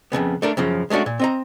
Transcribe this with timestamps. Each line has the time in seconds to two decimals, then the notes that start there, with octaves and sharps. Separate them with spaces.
0.12 F2 A2 C#3 B3
0.42 A3 D4 A#4
0.57 F#2 C#3 F3
0.90 G#3 A3 C#4 D4 F#4
1.06 A#2
1.19 C4 D#5 A#5